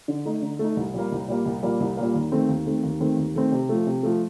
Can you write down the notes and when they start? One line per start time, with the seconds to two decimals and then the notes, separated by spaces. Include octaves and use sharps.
0.08 D3
0.26 A3 D#4
0.42 D3
0.59 A3 D#4
0.77 C2
0.94 A#2 G3 A#3
1.12 C2
1.28 A#2 G3 A#3
1.45 C2
1.63 A#2 G3 A#3
1.80 C2
1.97 A#2 G3 A#3
2.14 D#2
2.32 D#3 A3 C4
2.49 D#2
2.66 D#3 A3 C4
2.84 D#2
3.00 D#3 A3 C4
3.17 D#2
3.35 D#3 A3 C4
3.52 C3
3.69 F3 A3
3.87 C3
4.03 F3 A3